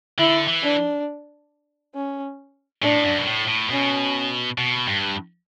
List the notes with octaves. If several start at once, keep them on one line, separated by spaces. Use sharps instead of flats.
D3 E4
E3
D4
C#4
A2 D4
F#2
B2
A2
A2
B2 C#4
B2
G2